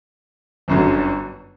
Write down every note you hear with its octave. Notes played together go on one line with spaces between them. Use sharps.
G1 F#2 D3 F#3